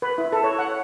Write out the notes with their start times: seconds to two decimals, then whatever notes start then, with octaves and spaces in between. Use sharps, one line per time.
0.02 B4
0.18 E4
0.32 A4
0.44 C#5
0.58 F#5